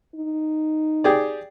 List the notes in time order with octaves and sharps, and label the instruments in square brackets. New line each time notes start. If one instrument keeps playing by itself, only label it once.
[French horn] D#4
[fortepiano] G4 G#4 D5